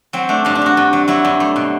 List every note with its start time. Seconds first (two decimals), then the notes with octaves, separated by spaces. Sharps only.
0.13 F#3 C4
0.29 A3 D4
0.45 G2 D4
0.55 D4
0.62 G2 F#4
0.77 G2
0.93 F#3
1.08 F#3 E4
1.25 G2
1.40 A3
1.56 B2